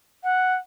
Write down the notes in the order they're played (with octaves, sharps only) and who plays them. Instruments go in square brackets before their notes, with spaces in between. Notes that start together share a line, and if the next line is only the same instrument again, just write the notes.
[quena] F#5